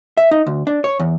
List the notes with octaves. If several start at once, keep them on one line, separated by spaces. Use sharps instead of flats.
E5
D#4
D2
D4
C#5
E2